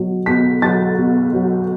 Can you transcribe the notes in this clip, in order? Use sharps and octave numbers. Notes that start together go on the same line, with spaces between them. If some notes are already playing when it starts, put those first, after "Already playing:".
Already playing: B2 F#3
B2 B6
F#3 A6
B2
F#3